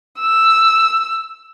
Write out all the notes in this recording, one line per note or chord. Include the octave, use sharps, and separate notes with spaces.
E6